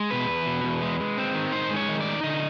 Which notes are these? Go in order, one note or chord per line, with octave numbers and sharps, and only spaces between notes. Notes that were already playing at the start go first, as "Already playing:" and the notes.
Already playing: G#3
B2 B4
E2
B2
E2
G#3
G#3
C4
D#3
D#4 C5
G#3
C#5
D#3
D5
D#4
D3 D#5